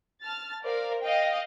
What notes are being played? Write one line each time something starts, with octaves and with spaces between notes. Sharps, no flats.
A5 F6 A6
A#4 C5 D5 F5
D#5 F5 G5